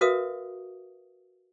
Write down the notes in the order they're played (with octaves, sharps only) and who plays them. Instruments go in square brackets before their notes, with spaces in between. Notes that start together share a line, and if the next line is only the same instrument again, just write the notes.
[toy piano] F#4 A#4 B4 E5 F5 D#6